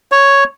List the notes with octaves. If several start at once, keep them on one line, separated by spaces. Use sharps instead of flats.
C#5